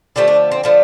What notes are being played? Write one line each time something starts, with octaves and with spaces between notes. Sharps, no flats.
D3 F3 A3 G4
D4
C4
D3 F3 A3